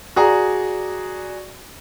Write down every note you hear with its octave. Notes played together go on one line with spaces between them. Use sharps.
F#4 G#4 D5 A#5